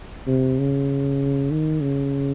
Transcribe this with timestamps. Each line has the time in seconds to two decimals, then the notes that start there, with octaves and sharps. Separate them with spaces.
0.27 C3
0.59 C#3
1.51 D#3
1.81 C#3